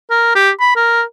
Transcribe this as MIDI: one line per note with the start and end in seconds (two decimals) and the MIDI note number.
0.10 0.35 70
0.35 0.50 67
0.60 0.72 83
0.76 1.02 70